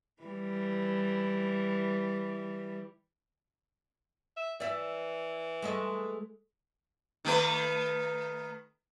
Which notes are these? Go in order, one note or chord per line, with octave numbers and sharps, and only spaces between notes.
E3 G3
E5
E3 D5 E5
G#3 A3 D#5
D#3 A3 B4